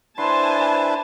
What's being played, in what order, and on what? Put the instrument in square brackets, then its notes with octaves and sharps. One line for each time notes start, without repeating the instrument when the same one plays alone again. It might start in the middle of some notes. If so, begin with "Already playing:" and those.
[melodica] D4 E4 B4 [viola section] C5 G#5 A5 [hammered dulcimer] C6